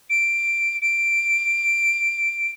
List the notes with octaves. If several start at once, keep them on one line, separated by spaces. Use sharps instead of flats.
D7
D7